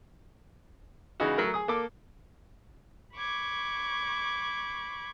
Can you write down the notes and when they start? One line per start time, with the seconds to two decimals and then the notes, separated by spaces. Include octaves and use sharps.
1.20 C#3 E3 G#3 D#4 F#4
1.38 F#3 A3 A#4
1.54 G#4 D#6
1.68 A#3 A4 D6
3.14 B5 C#6 D6 G#6